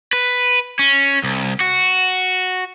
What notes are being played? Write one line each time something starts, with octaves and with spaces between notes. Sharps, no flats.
B4
C#4
C2
F#4